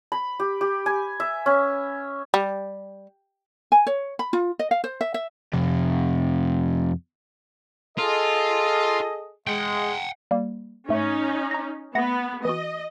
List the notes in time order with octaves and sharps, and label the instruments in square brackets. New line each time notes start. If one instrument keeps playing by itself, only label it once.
[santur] B5
G4
G4
G#5
E5
C#4
[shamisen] G3
[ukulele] G#5
C#5
B5
F4
D#5
F5
C5
E5
E5
[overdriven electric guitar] F2 C3
[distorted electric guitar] F4 [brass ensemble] G#4 A4 D#5
[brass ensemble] G#3 [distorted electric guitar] F#5 G5
[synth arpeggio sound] G3 A#3
[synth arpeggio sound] G#2 A3 [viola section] C#4 D#4
[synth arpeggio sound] A#5 A#6
[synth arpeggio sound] A3 F#5 A#6 [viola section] B3
[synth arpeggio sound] E3 F#4 [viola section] D#5